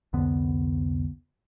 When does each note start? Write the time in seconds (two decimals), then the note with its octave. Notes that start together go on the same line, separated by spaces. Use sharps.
0.13 C2 F2 D3 B3